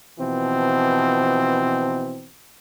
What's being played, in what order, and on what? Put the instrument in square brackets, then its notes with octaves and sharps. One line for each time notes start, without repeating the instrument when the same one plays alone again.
[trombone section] B2 E3 F3 C4